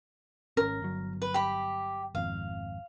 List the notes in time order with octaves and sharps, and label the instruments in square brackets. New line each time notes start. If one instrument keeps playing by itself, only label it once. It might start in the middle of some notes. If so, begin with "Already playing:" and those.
[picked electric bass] G#1 C#4 [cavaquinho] A#4
[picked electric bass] G1 F#3
[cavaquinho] B4
G4 B5
[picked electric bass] G#1 F2 [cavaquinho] F5